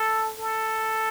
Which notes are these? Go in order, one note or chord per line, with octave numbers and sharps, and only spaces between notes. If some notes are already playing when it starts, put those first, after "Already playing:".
Already playing: A4
A4